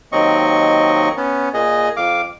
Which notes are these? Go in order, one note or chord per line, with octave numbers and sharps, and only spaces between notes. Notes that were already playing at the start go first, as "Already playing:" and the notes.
D#2 F#3 C4 D#5 C#6
B3 C#4
A#2 G#4 D#5
F2 F5 D6